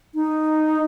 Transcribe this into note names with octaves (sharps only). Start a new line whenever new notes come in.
D#4